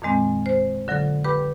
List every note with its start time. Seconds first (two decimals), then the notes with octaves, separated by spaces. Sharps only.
0.02 F2 A#2 D#3 G#3 C4
0.46 C5
0.88 D3 F#3 F4 A4
1.24 G4 B4 G5 B5 D6